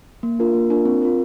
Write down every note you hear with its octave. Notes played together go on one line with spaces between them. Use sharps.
A#3
D4 F4 A#4
A#3
D4 F4 A#4
C4
F4 A#4